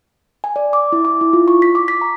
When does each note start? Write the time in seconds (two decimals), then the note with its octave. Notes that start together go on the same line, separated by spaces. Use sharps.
0.44 G#5
0.56 D5
0.73 D6
0.92 E4
1.05 D6
1.21 E4
1.33 F4
1.48 C#6
1.62 B6
1.75 D6
1.88 B6
2.01 A#5